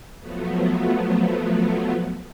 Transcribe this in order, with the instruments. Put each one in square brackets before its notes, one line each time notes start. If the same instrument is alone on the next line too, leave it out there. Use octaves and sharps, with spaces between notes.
[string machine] F3 F#3 A3 B3